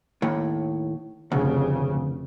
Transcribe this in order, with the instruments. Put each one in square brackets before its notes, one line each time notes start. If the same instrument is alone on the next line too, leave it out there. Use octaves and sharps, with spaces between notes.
[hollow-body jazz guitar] D#2 A2
[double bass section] F1 C#3 [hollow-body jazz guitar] D2